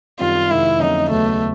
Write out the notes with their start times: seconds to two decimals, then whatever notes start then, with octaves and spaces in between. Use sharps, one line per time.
0.19 F#2 D#3 G3 C4 F4
0.50 F2 C3 D#3 G#3 E4
0.80 F2 D3 F#3 A#3 C#4 D#4
1.10 D#2 C#3 F#3 A3 B3